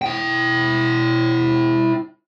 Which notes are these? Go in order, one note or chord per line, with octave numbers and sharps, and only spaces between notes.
E4 G5